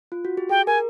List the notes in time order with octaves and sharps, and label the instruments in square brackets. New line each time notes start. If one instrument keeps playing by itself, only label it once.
[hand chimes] F4
F#4
G4
[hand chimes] G#4 [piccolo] G5
[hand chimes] A#4 [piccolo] G#5